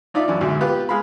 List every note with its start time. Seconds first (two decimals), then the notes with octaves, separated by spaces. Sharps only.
0.14 D4 D#4 F4 D5 E5
0.28 F#2 E3 D4
0.41 D2 G#2 B2
0.61 B3 F4 G4 B4
0.89 G#3 F5 B5